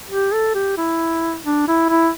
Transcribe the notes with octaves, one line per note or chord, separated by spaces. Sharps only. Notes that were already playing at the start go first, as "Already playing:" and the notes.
G4
A4
G4
E4
D4
E4
E4